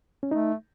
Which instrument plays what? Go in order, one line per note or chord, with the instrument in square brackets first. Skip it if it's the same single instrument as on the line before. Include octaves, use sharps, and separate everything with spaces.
[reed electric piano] C#4
[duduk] A3 [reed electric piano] D#4